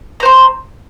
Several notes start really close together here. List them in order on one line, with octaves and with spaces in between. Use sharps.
A#5 C5 C6